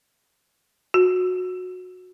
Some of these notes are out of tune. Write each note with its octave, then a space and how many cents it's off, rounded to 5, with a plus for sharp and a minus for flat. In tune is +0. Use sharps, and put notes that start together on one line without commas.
F#4 -20